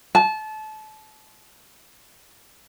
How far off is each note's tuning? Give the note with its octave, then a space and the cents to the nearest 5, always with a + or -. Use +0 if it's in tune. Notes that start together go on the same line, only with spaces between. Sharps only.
A5 -25